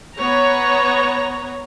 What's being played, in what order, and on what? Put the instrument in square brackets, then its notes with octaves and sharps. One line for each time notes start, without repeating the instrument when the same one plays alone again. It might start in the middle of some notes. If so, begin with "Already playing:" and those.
[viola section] B3 C#5 A#5